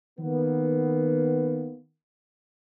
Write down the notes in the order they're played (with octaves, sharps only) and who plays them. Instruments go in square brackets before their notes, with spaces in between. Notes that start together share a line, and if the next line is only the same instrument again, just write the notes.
[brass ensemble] D#3 A#3 B3